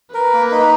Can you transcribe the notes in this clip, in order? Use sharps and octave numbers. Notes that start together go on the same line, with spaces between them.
A#4 B4
A#3
D#4